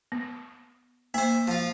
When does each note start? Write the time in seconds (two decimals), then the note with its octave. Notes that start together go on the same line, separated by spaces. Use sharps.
0.12 B3
1.14 A#3 C5 E5
1.48 F3 F4